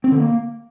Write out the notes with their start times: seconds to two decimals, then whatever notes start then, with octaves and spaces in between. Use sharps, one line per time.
0.04 C4
0.12 D3
0.20 A#3